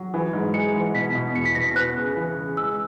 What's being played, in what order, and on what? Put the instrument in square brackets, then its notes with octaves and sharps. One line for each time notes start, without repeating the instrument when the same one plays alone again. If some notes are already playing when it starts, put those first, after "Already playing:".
Already playing: [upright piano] F#3
E3
G#2
[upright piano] G#3 [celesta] C#7
[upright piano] E3
[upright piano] B2 [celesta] B6
[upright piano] B2
[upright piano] E2 [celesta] C#7
[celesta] B6
[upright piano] B2 [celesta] A#6
[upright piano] B3 [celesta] F#6
[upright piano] C#3
E3
C#3
[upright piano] G#3 [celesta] E6